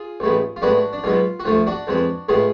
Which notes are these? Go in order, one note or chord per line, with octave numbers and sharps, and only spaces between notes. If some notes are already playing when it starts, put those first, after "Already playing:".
Already playing: F4 G#4
A1 A2 G#3 B3
F4
A2 G#3 B3 D4 F#4
D4
B1 B2 G#3 B3 F4
F#4
D2 D3 F3 A3 F4
D4 F#4
F2 F3 G#3 B3
A2 G#3 B3 F4 G#4